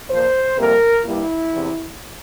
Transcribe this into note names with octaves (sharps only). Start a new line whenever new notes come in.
A#2 F3 A#3 C5
F2 C3 G3 A#3 A#4
G2 G3 A#3 E4
E2 C3 E3